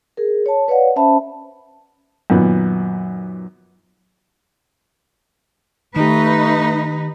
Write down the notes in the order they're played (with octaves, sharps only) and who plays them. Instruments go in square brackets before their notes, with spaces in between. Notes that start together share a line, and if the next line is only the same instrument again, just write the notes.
[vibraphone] G#4 A#4
C#5 A5
B4 C#5 D5 F5 F#5
C#4 C5 E5 A5 B5
[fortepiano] F#2 A#2 D#3 B3
[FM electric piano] D#3 G4 [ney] A3 [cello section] D#4 B4